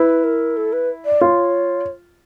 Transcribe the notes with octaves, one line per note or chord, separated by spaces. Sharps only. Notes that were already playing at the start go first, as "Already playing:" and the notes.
Already playing: E4 B4
A#4
A4
B4
D5
F4 C#5